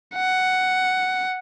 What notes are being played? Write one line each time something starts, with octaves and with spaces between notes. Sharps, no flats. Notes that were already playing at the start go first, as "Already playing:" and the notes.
F#5